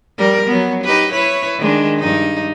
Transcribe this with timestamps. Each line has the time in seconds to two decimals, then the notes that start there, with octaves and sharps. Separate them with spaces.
0.18 G3 A#4
0.47 F#3 B3
0.84 D#4 G4 B4
1.13 E4 B4 C#5
1.59 D#3 G#3 D4
1.99 G2 D#4